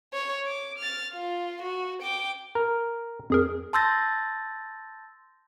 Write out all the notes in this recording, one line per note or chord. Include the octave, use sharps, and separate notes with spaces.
C#5
D6
F6 A6
F4
F#4
G5 D6
A#4
F2 G#4 A#4
A5 C6 E6 G6 A6 A#6